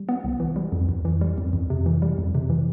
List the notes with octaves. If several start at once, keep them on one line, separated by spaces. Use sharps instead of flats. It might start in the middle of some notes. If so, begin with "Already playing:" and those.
Already playing: G3
B3
C2
E3
G3
F2
F2
E3
G3
F2
F2
C3
E3
G3
F2
C3
E3